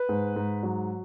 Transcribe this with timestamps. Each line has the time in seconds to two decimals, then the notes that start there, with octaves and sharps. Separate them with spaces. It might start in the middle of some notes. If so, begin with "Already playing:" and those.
Already playing: B4
0.09 G#2
0.36 G#2
0.63 F#3